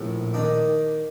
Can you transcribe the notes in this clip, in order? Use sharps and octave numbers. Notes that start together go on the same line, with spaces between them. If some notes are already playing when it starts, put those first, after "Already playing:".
Already playing: A#1 A2
D#3 D4